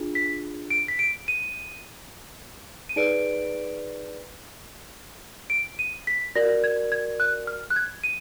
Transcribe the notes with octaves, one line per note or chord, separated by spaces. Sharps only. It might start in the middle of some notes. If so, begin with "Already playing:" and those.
Already playing: D4 F4 G#4
B6
D7
B6
D7
D#7
D#7
D#4 G#4 B4 D5 D7
D7
D#7
B6
F#4 A#4 D5 A#6
G#6
G#6
F#6
F6
F#6
G#6
D#7